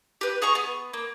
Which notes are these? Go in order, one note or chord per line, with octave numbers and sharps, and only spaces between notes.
G4 B4
G#4 A#5 C#6
B3
A#3